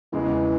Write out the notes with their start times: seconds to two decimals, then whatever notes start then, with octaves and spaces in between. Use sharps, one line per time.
0.12 E2 C#3 E3 G#3